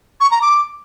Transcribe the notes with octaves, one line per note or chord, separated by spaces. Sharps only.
C#6
A#5
D6